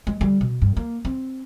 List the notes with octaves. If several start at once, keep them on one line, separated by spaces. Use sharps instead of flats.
G#3
D3 G3
B2
G2
A#3
C4